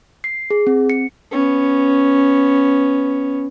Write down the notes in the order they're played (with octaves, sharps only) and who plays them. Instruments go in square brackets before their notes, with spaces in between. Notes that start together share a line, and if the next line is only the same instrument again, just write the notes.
[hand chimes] C7
G#4
C4
C#7
[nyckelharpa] B3 C#4